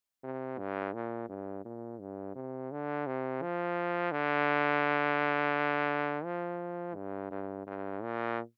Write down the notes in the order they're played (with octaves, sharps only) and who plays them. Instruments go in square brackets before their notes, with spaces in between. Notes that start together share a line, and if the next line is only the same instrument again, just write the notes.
[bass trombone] C3
G2
A#2
G2
A#2
G2
C3
D3
C3
F3
D3
F3
G2
G2
G2
A#2